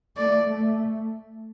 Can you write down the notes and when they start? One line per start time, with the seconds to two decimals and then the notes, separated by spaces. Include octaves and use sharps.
0.17 A3 D5
0.48 A3